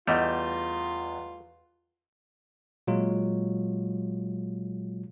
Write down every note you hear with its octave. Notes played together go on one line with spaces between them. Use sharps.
E2 E3 G3 A3 F4 D#5 F#5
A#2 F#3 G#3 F4